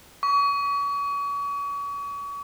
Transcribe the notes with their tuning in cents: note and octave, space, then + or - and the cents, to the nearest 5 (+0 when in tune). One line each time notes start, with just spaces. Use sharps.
C#6 +40